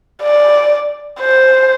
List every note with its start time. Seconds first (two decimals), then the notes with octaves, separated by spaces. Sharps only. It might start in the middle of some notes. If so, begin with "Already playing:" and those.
0.23 D5
1.20 C5